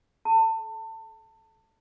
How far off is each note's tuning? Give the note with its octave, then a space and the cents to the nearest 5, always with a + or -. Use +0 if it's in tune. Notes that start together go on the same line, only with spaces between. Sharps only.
A4 -45 A5 +25